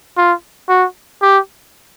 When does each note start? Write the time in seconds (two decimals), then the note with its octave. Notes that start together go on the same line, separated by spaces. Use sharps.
0.17 F4
0.69 F#4
1.22 G4